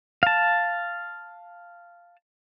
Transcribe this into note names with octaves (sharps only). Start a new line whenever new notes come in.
F5 A5